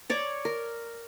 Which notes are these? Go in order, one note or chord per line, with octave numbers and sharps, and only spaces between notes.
C#5 D5 A#5
A#4